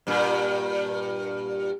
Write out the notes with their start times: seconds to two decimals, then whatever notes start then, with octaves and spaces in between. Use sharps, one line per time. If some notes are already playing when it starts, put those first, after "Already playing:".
0.07 G2 A#2